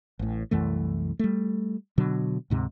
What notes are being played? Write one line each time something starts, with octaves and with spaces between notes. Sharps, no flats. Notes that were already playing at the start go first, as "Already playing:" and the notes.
A1 A2
C2 F#2 E3 A3
G3 A3
B2 D3 F#3
D2 G#2 C3